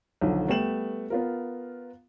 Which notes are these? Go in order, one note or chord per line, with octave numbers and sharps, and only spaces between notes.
B1 D3 D#3 F3
G3 A3 B3 G5 E7 F#7
B3 F4 A#4